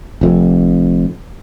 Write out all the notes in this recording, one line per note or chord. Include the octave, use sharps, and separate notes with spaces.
F1 F2